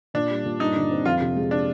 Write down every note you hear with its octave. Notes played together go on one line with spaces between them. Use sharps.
A#2 D4
G3
A#2
G2 D#4
D3
C4
F2 F4
C3
G#3
D4